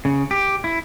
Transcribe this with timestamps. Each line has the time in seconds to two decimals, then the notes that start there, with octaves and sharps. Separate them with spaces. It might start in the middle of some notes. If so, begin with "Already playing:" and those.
0.05 C#3
0.31 G4
0.64 E4